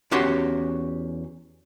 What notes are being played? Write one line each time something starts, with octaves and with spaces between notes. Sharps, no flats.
E2 C#4 F#4 G4 C6